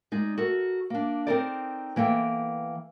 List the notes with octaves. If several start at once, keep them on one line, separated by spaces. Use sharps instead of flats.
G#3 D#4 D5
F#4 A4 A#4
A#3 D4
C4 D#4 A4 A#4 C5 D5
E3 A#3 B3 A4 G5